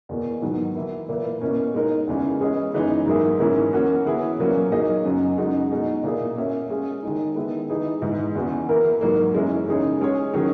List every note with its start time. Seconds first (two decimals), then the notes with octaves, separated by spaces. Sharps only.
0.09 E2 B2 A#3
0.42 G#2 D#3 F#3 B3 F#4
0.75 E3 A#3 E4 A#4
1.09 A#2 A#3 E4 B4
1.41 B2 A#3 C#4 E4
1.74 G#3 D#4 A#4
2.07 E2 C#3 E3 G#3
2.40 G#3 C#4 G#4 B4 D#5
2.74 F#2 E3 G#3 B3 D#4
3.06 G#2 F#3 A#3 E4 G#4
3.40 G#2 E3 A#3 C#4 E4
3.73 A#3 C#4 F#4
4.06 E3 B3 E4 G#4 B4
4.39 A#2 F#3 A#3 C#4
4.72 F#3 A#3 D#4 G#4 D#5
5.05 F#2 C#3 F#3
5.38 F#2 C#3 G#3 D#4 F#4
5.71 B2 G#3 D#4
6.03 A#2 A#3 E4 G#4
6.36 A#3 C#4 F#4 C#5 E5
6.70 G#3 C#4 G#4
7.02 D#3 G#3 D#4
7.36 D#3 G#3 B3 E4
7.69 E3 G#3 D#4 G#4 B4
8.02 G#2 E3 G#3
8.35 E2 C#3 E3 B3 F#4
8.69 E3 A#3 E4 A#4
9.01 G#2 F#3 A#3
9.34 F#2 E3 G#3 C#4 E4
9.68 C#3 G#3 D#4 G#4 C#5
10.01 G#3 C#4 G#4 C#5
10.34 D#3 F#3 C#4 G#4